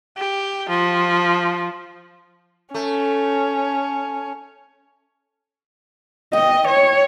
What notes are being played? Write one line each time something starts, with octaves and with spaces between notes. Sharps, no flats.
G4
F3
A3 C#4
D#5 G5
C#5